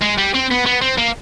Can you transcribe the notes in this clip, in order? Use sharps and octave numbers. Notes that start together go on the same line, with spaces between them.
G#3
G3
C4
B3
B3
C4
A#3